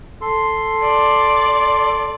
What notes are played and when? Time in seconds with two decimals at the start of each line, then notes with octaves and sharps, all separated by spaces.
0.22 A4 C6
0.83 D5